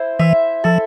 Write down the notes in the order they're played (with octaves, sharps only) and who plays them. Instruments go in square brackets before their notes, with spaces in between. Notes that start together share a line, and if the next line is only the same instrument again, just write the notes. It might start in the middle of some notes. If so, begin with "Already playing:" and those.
Already playing: [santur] E4 C5
[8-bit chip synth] E3 [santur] E5
[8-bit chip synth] F3 [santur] A4